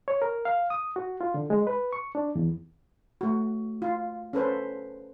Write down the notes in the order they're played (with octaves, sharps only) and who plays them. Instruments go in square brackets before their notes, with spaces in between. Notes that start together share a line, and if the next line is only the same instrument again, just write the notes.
[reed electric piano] C#5
A#4
F5
D#6
F#4
F4
D3
G#3
B4
C#6
D4
E2
[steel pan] A3 F#4
F4
C#4 A4 B4 C5